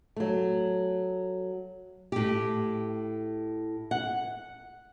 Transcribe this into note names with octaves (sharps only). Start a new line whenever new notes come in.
F#3 A3
A2 G4
F#5